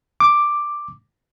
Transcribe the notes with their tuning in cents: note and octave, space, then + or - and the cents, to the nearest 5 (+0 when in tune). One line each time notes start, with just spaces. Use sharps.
D6 +5